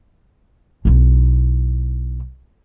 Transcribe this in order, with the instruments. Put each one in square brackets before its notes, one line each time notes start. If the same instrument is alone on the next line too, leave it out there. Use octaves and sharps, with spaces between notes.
[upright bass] B1 E4